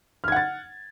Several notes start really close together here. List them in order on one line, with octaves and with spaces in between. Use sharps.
F6 G#6 F#5 A6